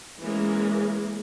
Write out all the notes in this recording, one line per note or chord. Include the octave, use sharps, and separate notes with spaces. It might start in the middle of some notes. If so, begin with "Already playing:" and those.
E3 G#3 A#3 C#4